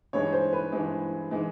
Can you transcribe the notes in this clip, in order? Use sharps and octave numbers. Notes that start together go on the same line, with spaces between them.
G2 E3 G#3 C#5
C5
B4
G2 E3 G#3
E3 G#3